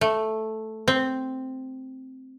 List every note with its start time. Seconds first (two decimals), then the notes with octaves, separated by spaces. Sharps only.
0.01 A3
0.88 C4